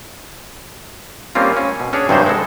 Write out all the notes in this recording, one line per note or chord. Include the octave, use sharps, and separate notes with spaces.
G3 A#3 C4 C#4 F4
C#4
B2
C#4 D4 G#4 C#5
G2 C3 F#3 G3 D#4 C5
G#3 A4